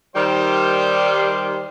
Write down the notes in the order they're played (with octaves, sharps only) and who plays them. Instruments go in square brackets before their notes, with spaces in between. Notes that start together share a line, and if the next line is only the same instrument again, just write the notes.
[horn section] D#3 G3 C5